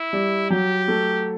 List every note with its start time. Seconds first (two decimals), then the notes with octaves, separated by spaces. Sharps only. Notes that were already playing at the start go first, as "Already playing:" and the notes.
Already playing: E4
0.13 G3
0.50 F#3 G4
0.88 A3